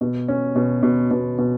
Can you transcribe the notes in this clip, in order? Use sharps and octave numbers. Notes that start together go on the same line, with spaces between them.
B2
C#4
B2
B2
B2
B2